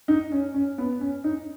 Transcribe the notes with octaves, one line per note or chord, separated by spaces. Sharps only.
D#4
C#4
C#4
B3
C#4
D#4